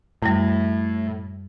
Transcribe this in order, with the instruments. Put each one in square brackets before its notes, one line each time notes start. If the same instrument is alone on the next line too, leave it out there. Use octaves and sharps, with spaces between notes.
[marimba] F#2 G3 [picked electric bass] A2